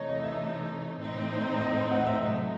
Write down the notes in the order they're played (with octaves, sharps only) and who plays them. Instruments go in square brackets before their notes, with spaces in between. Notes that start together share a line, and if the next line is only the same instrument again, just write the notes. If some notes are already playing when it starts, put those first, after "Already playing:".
Already playing: [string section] C3 E3 A3 D#4 [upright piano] C#5
[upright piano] D#5
E5
[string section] A2 E3 C4 D#4
[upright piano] D#5
F#5
E5
[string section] C3 F#3 A3 D#4 [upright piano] D#5